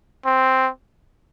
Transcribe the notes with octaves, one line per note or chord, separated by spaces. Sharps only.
C4